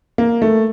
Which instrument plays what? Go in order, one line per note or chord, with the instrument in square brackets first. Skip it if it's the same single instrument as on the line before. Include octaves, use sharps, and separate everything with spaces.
[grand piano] A#3
A3